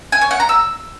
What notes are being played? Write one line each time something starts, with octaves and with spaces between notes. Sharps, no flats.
G#5
C#5
F#5
A#5
E6